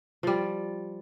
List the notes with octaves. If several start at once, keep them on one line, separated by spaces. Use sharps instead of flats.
F3 G3